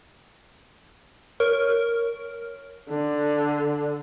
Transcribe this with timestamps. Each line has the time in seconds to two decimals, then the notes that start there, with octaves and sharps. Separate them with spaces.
1.40 A#4 C#5
2.90 D3